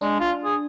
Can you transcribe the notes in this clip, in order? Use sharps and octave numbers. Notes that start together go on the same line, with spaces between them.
G#3 D4
F4
G#4